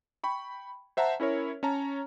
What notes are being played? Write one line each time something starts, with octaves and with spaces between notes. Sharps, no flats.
G5 B5 C#6
C5 E5 F#5 A5 A#5
C#4 E4 A#4 C#5
C#4 C#5 A5 A#5